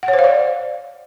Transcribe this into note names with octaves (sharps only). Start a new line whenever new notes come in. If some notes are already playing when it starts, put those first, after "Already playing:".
F#5
C#5
C5
F5
D5